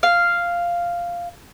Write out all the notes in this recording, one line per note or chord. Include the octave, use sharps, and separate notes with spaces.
F5